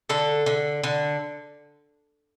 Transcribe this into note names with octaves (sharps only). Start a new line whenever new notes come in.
D3 A4
D3
D3